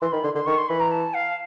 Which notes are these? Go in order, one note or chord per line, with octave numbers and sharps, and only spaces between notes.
E3 C6
D#3 B5
D3 C6
D3 C6
D#3 C#6
C6
E3 B5
A#5
A5
F5